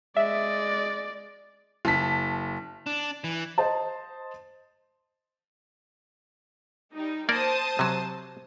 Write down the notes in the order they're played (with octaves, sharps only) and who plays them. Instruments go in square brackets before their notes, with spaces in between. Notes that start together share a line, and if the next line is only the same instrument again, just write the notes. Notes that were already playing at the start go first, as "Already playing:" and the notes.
[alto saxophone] G#3 [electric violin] D5 [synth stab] E5
[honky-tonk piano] F#1 A5 B6
[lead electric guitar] D4
E3
[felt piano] C5 D#5 A5
[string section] G3 D#4
[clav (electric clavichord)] A#3 A#4 D5 [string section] C5 A5 D#6
[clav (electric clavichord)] C3 F#3